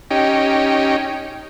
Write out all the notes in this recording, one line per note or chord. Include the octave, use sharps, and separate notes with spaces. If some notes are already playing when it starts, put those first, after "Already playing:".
C#4 D#4 G4